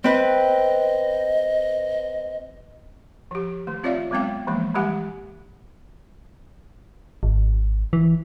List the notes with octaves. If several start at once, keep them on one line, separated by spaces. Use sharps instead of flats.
C4 B4 D#5
F3 G4
D#3 A3
C4 F4 C#5 D5 E5 F5
F#3 G#3 B3 C4 F5 G5
E3 F3 G#3 A#3
E3 G3 G#3 G4 F#5 G#5
G#1
E3